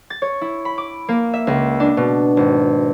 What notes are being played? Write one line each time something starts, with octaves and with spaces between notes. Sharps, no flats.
A6
C#5
E4
B5
D6
A#3
E5
C#2
D4
B2
G#1